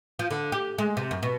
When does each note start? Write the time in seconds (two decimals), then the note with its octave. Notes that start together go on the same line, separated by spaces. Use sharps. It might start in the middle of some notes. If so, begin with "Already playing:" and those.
0.19 F3
0.31 D3
0.52 G4
0.78 G#3
0.97 C3
1.11 F#2
1.23 B2